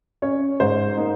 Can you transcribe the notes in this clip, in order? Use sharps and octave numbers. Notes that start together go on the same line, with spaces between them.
C#4 C#5
G#2 C5
A#3 D#4